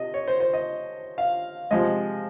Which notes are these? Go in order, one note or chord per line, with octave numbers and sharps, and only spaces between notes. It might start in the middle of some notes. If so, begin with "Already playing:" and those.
Already playing: C3 D#5
C#5
C5
C5
D#5
F5
C3 F3 G#3 D#5